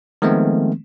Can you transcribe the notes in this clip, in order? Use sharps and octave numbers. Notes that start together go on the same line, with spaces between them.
D#3 F3 G#3 A3 B3 C4